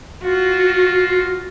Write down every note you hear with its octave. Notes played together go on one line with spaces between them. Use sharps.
F4 F#4